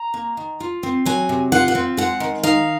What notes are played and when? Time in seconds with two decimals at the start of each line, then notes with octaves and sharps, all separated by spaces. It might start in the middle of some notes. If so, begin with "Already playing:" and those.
Already playing: A#5
0.14 A#3
0.37 D#3
0.60 F4
0.83 C4
1.06 F#3 G#5
1.29 C3
1.52 F4 F#5
1.68 F#5
1.75 C4
1.97 G#3 F#5
2.20 D#3
2.43 D#4 F5